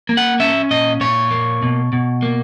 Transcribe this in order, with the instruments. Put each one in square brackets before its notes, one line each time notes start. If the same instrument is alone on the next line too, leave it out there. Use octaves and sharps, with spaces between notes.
[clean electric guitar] A#3
F#5
C#4 E5
A#2 D#5
A#2 C#5
A#3
B2
B2
A#3